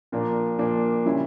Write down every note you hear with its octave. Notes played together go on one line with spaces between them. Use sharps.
A#2 F3 A#3 D4
A#2 F3 A#3 D4
C#3 G3 C#4 E4